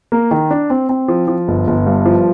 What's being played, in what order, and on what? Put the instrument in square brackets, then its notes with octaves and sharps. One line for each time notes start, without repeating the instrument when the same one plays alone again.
[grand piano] A#3
D#3
D4
C4
C4
F3
F3
G1
G1
G2
F3